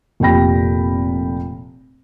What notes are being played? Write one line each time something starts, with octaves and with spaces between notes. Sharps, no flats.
F1 A#2 G4 G5 B5 A#6